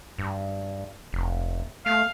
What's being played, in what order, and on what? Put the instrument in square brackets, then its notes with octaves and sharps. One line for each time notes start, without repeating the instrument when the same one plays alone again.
[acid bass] G2
F1
[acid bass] A3 [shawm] F5